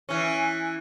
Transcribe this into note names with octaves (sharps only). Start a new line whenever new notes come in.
E3 C#4